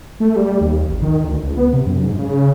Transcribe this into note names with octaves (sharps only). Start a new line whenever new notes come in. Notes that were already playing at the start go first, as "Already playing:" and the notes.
A3
G3
D#2
G#1
D#3
D2
C#2
B3
C3
F#2
G#2
C#3